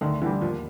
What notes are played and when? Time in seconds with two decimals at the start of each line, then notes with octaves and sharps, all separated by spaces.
0.01 D2 D#3
0.22 D3 E3 G3
0.41 D#2 F3